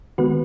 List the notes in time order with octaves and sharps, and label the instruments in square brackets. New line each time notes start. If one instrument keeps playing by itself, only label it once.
[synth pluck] D#3 G#3 B3 F#4 B4